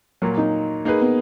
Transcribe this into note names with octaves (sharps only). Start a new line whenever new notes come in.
A#2 F#3 A#3
D#4
A#3 D#4 G#4 B4
B3